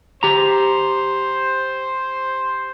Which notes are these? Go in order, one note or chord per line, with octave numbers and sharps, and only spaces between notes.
G4 C5 A#5